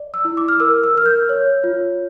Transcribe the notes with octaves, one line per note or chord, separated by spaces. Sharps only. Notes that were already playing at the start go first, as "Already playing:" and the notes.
Already playing: D5
E6
E4
D6
F6
A#4 E6
E6
A#4 F6
G6
C#5
F4